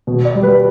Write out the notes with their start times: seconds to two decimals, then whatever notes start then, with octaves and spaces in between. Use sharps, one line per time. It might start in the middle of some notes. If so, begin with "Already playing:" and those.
0.07 B2
0.25 D5
0.35 G3
0.43 B4